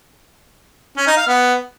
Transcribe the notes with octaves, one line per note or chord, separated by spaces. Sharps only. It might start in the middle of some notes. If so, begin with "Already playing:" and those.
C#4
D#4
F5
B3